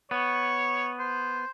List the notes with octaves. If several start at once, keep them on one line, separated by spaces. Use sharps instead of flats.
B3 C#5
C5